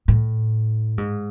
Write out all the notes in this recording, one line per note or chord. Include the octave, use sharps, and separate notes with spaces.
A2
G#2